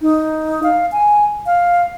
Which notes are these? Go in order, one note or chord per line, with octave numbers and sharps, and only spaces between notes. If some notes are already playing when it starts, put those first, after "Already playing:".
D#4
F5
G#5
F5